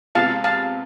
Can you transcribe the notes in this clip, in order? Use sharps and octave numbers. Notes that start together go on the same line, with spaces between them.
C3 G#3 B3 F4 F5 A5
F5 A5